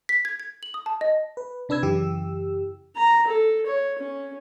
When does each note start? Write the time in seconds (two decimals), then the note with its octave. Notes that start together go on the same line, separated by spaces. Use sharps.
0.09 B6
0.25 G#6
0.40 G#6
0.63 F#7
0.74 D#6
0.86 A5
1.01 D#5
1.37 B4
1.69 C3 D4 B4 E6 G#6
1.82 F#2 C#3 E3 G4 E6
2.96 A#5
3.27 A4
3.66 C#5
3.98 C#4